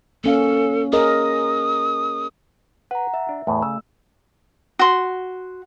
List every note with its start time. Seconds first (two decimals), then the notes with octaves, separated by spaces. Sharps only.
0.24 A#3 C#4 A4 F5
0.93 G#4 A#4 D#5 D#6
2.91 B4 F#5 A#5
3.14 E5 A5
3.29 D4
3.47 E2 A2 A3
3.62 C#3 E6
4.79 F#4 C6